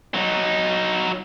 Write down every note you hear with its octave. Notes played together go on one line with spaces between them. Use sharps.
F#3 D#4